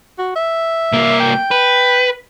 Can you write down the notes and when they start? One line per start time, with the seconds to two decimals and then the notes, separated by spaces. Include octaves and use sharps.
0.18 F#4
0.35 E5
0.92 C2 A#3
1.20 G5
1.51 B4